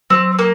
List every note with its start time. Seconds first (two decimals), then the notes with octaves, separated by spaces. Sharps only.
0.10 F#3 C4
0.39 A#3